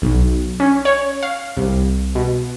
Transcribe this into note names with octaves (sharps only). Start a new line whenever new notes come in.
B1
C#4
C#5
F5
C2
B2